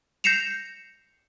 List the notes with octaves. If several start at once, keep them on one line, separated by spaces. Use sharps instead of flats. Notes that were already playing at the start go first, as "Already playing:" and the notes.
G6 A#6 C7 C#7 E7 F7